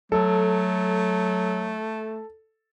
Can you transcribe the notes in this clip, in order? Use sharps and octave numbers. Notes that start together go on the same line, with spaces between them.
F#3 A3 A4